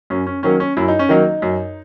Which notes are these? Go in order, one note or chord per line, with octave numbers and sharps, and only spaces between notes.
F#2 C#4
C#4
D#3 F#3 A#3 C#4
C#4
F#2 E4
D#4
C#4
D#3 F#3 A#3 D#4
F#2